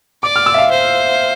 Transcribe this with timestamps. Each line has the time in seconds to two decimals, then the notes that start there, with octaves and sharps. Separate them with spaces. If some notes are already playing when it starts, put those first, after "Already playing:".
0.23 D5 D6
0.36 F6
0.46 E6
0.54 E5
0.58 F5
0.70 C5